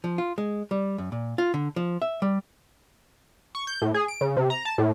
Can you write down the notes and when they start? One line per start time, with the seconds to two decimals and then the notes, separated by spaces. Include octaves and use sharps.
0.04 F3
0.18 F4
0.38 G#3
0.71 G3
0.98 F#2
1.12 A#2
1.38 F4
1.54 D3
1.76 F3
2.02 E5
2.22 G3
3.55 C#6
3.67 G6
3.82 A2
3.94 G#4
4.08 D7
4.21 C#3
4.37 C3
4.50 A#5
4.65 A5
4.78 A2